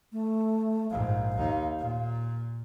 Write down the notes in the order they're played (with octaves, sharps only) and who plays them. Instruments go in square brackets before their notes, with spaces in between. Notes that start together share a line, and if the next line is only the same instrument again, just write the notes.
[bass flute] A3
[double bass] A#1 G#2 [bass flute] F5
[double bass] D#2 D#4
A#2